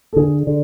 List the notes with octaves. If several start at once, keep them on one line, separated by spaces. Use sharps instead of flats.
A4
D3 G#4
D3